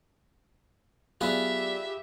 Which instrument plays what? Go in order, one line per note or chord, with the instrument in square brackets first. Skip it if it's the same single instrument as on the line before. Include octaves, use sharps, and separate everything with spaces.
[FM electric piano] F#3 B3 D5 [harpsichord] F4 G#4 B4 [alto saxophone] G4 [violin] E5